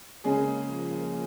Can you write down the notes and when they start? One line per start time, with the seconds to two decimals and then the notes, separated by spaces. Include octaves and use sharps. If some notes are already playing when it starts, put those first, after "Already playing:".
0.24 C#3 G#3 A#3 C#4 G#4
0.62 F3